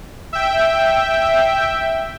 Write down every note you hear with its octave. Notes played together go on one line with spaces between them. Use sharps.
E5 G5